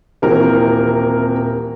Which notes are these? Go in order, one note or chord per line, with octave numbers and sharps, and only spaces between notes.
D#1 C3 E3 A#4